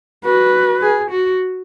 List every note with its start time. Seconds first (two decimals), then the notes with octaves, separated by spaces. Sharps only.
0.25 F#4 B4
0.81 G#4
1.11 F#4